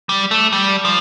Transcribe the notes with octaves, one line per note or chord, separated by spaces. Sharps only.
G3
A3
G3
F3